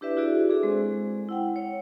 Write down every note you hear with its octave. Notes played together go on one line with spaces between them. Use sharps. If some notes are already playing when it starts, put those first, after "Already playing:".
D4 E4 G4 B4 D5 E5
E4 F#4 G#4 D5 E5
D4 G#4 A4
G#3 C4 C5
E4 F#5 G5
C#5